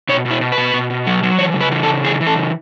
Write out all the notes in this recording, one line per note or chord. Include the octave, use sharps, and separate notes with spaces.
B2 C#5
B2
E4
B2
B4
B2
B2
B2
F#3
F#3
E3 C#5
C#3 B4
E3
A4
C#3
E3 G#4
E3
A4
C#3